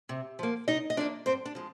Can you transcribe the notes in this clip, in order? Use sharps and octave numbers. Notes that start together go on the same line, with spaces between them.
C3
F3 A#3
C3 D#4 D#5
D#5
F3 A#3 D4 D5
G2 C4 C5
D4
F3 G#3